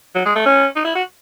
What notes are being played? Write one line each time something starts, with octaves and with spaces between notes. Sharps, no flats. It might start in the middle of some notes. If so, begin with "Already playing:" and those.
F#3
G#3
A3
C#4
D#4
E4
F#4